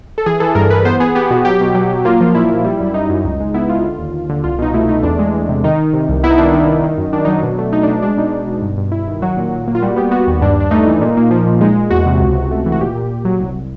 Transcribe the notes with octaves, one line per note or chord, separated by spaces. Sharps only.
A4
E3 G#4
E3 A4
G2 A#4
E3 B4
B3 C5
B3 G#4
B3 G4
B2 F#4
F#3 G4
B2
F#3
F#3
A#3 F4
F3 F4
A#2 E4
A#2
G3
F#2
E4
F#2 D#4
F#2
C#2
G#3
B3 E4
G#3 F4
D3
D#2
D#2
D3
C2 F4
B2 D#4
A3 E4
A3 D#4
E2 D4
G#3
E2
C3
D#3 D#4
D#3
C3
C2
B3 E4
D#4
D#3 D4
D#3 D#4
D#3
D#3
F#2
D#3 D4
F#3 D#4
D4
B2
A3
A3 D#4
D4
B2 D#4
G#3 D4
B2 D#4
B2
B2
G2
G2
G2 E4
D#3
F#3 F#4
A#2
A#2
A#3
F4
G3 F#4
B3 G4
B3 F#4
D#2
G2 D4
G2 D4
A3 D#4
E3
A#2
A#3
F3
A#2
G#3 D#4
G#3
E2 F#4
C3
C#2
C#2
A3
E3
F#4
A#2 G4
A#2
A#2
F#3
C2